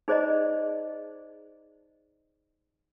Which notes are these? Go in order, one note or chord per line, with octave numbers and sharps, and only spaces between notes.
D#4 G#4 C5 D5 D#5 A#5